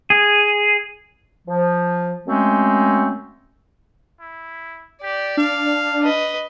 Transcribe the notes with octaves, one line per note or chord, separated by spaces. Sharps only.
G#4
F3
F#2 G#3 A3 C4 C#4
E4
G4 D5
D4 F5
B4 D#5